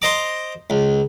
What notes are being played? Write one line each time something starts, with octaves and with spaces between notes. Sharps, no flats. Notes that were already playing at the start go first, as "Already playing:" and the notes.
C5 D#5 A#5 D6
C#2